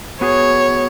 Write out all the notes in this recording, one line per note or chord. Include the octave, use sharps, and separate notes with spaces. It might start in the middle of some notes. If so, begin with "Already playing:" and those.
B3 F#4 G#4 C#5